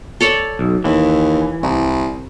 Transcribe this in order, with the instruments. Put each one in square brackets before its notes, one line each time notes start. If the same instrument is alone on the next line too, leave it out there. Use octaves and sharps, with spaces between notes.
[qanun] A4 C#5 D5
[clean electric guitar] B1
[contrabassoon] D#2 [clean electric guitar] E3
[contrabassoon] C2